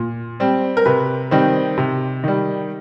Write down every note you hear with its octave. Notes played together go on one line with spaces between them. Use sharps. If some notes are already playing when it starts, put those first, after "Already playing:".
Already playing: A#2
G3 C4
A#4
C3 B4
D#3 G3 C4
C3
D#3 G3